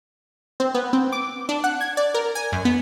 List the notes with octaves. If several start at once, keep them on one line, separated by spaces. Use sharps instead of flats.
C4
B3
C4
D6
D4
F#5
G#6
D5
A#4
G#5
F#2
B3